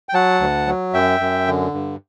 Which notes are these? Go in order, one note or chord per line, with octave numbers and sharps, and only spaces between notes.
G5
F#3 F#5 A5
D2
F#3
F#2 E5 G5
F#2
D3
G2